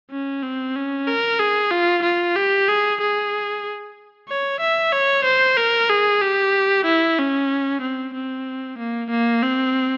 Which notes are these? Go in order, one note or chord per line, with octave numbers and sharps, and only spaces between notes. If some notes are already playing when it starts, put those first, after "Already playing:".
C#4
C4
C#4
A#4
G#4
F4
F4
G4
G#4
G#4
C#5
E5
C#5
C5
A#4
G#4
G4
E4
C#4
C4
C4
A#3
A#3
C4